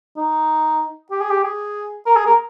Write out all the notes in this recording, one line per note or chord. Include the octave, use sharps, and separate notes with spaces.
D#4
G4
G#4
G4
G#4
A#4
G#4
A#4